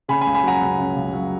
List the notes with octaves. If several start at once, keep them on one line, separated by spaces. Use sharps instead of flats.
C#3 G#5 B5
G#5 B5
C#2
G#5 B5
F#3 F#5 A#5
C#2
C#3
C#2
F#3